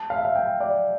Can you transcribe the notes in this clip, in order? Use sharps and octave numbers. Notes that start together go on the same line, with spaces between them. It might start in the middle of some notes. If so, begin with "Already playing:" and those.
Already playing: A5
F5
E5
F5
G5
D5